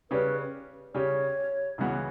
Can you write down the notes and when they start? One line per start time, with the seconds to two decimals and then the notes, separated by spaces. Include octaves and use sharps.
0.11 C#3 G3 C#4 G4 B4
0.94 C#3 G3 C#4 G4 C#5
1.78 C#2 C#3 E3 B3 F#4